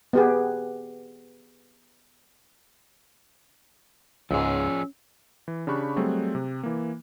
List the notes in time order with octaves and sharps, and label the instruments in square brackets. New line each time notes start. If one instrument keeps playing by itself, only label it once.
[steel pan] B3 G4 G#4
[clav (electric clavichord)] C#2 G#2 [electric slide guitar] F3 G#4 [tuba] C#4 [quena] E6
[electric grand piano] E3
C#3 D4 G4 B5 C#6 F#6
F#3 G3 A3 C4 G#4
C3
E3 A#3